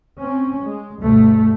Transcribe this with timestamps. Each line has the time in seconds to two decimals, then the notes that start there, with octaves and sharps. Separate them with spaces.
0.22 C4 C#4
0.65 G#3
1.01 D2 G2 B2 A3